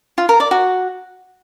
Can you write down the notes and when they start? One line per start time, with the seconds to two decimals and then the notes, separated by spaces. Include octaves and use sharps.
0.18 F4
0.29 A#4
0.40 D5
0.51 F#4